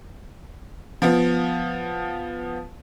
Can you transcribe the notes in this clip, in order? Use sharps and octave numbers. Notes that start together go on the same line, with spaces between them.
F3 B3